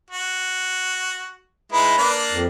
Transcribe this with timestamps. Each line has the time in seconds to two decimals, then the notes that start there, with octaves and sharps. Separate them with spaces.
0.10 F#4
1.73 G#3 D#4 E4 B4
1.98 A#3 D4 D5
2.32 F2